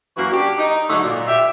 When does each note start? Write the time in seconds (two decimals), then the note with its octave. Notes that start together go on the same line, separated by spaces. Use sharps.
0.17 F#2 E3 A#3 F#4
0.32 D4 G4
0.58 D#4
0.90 G#2 D3 F#3 A3 D#4
1.04 A#2
1.28 G4 E5